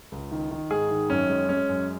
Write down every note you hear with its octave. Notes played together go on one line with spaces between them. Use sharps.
C#2
D#3
D#3
G#2 G#4
D#3
F#2 C#4
G#3
G#3 C#4
F#2